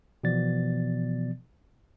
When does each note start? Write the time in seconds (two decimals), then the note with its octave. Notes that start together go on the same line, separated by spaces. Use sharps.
0.24 B2 E3 F3 B3 D5 A6